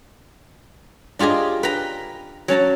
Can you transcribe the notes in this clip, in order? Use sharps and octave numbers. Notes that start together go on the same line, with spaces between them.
D4 F4 G4 G#4 D#5
B4 G5 A#5
F#3 C#4 A5 A#5